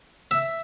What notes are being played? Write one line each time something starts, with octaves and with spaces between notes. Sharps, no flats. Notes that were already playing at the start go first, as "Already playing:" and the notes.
E5